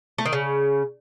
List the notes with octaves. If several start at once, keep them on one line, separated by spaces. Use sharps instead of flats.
A3
D#3
C#3